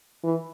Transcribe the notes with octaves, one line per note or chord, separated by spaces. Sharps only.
E3